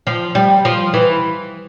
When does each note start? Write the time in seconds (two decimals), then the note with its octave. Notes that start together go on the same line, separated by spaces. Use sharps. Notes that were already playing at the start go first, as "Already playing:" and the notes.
0.07 F3
0.35 G3
0.65 F3
0.94 E3